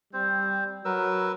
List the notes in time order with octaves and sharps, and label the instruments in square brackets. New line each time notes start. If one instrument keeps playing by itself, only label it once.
[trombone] G3 [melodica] C4 C5
[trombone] F#3 [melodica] A#4 B4 E6